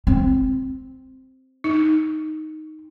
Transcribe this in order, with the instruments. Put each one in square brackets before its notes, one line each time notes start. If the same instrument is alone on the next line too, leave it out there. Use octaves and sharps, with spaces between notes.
[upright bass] C4
[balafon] D#4